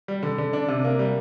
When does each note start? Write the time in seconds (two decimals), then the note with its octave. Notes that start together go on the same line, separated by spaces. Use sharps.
0.08 G3
0.23 D3
0.38 D3
0.53 D4
0.68 C3
0.85 A#3
0.99 G3